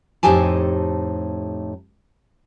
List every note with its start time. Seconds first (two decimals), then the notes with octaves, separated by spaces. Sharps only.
0.23 F2 A2 D#4 G4 G#5 A5